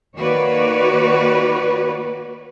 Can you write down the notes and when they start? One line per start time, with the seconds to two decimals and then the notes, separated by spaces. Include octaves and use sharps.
0.16 D#3 A#3 F#4 B4 C#5 D5